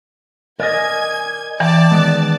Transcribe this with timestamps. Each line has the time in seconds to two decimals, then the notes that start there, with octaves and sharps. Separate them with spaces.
0.60 A#4 D5 D#5 G#5 G#6
1.60 E3 D5 G5 A5 A6
1.91 D#3 G#3 B3